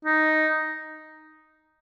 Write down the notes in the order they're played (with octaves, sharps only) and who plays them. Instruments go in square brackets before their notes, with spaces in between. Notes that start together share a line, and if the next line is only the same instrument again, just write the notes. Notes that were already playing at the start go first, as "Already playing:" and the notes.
[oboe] D#4